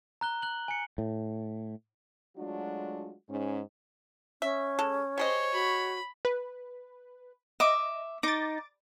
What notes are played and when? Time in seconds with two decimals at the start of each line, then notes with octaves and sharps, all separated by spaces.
0.21 A#5 F#6 G7
0.42 F#6 F#7
0.68 G#5 C#7
0.98 A2
2.37 F#3 G#3 A3 D4 F4 F#4
3.29 G#2 C#4
4.42 C#4 E5
4.79 G#3 A4
5.18 G3 G#4 C5 C#5 D#5
5.53 F#4 B5
6.25 B4
7.60 D#5 E5 D6
8.23 D#4 D6 A6